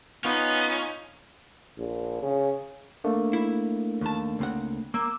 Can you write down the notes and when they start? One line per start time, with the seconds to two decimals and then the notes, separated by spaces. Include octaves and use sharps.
0.24 B3 C#4 D#4 F4
1.78 A#1
2.22 C#3
3.04 A3 A#3 D4
3.33 E4
4.01 D#2 A5
4.39 C#2 C4 F#5
4.94 A#3 D6 E6